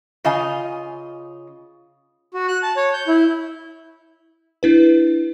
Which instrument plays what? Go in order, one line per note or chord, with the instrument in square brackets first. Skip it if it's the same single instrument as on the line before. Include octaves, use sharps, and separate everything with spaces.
[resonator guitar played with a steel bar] C#3 F4 D#5 G#5
[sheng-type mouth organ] F#4
F#6
A5
C#5
G6
E4
[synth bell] D4 E4 B4